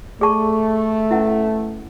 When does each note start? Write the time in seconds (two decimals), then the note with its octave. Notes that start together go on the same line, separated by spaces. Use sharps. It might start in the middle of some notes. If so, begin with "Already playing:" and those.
0.20 A3 G#4 D5 A5 C#6
1.11 C#4 E4 B4 F#5